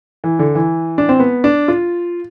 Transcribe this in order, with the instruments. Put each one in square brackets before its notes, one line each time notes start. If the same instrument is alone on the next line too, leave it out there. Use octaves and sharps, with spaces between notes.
[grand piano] E3
D3
E3
D4
C4
B3
D4
F4